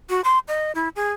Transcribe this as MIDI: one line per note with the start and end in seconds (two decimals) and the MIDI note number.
0.10 0.21 66
0.24 0.38 84
0.48 0.72 75
0.75 0.89 64
0.96 1.14 68